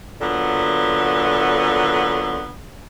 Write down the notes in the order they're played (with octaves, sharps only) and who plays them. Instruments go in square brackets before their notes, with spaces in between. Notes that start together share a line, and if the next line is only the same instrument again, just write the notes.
[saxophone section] A#2 D3 F#3 B3